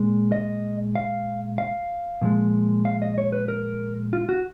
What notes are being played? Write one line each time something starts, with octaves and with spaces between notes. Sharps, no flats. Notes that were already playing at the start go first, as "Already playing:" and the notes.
Already playing: A#2 G#3
D#5
F5
F5
A#2 F3 G#3
F5
D#5
C#5
B4
A#4
F4
F#4